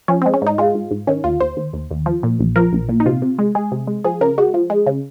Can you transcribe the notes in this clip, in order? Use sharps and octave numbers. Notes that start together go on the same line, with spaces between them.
F3 C#4
G#3 C4
C#4
G#2 D#4
G#3 F4
G#2
G#2
D#3 C#4
D#2 F4
D#2 C5
D#2
D#2
D#2
F3
A#2
A#1
F3 A#4
A#1
A#2
D#4
C3 F4
C3
G#3
G#3 G#4
C3
G#3
F3 G#4
C#3 A#4
G#3 F#4
F3
G#3
C#3